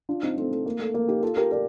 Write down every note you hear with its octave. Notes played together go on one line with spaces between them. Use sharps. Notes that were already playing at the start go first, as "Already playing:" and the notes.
D4 F4
C4 D#4
A3 C4
A3
A#3
A3
A#3
D#4 G4
F4 A4
G4 A#4
A#4 D5